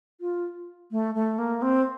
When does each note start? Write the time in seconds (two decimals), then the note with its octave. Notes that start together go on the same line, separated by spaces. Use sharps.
0.21 F4
0.91 A3
1.15 A3
1.38 A#3
1.62 C4